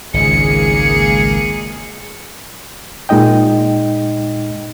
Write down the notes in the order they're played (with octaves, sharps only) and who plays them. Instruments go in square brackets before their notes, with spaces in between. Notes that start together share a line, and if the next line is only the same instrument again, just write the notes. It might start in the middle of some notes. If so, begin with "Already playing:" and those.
[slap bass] G#1 C#2 [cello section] G#3 A#3 G#4 [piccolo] C#7
[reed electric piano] A#2 G#3 D#4 D#5 G5